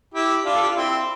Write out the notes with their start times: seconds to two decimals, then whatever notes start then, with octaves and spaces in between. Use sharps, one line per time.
0.14 E4 G4
0.45 D4 F4
0.55 A4
0.62 G4
0.69 F4
0.77 C4 E4